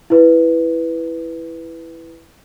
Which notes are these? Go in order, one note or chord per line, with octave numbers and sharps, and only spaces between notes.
E4 B4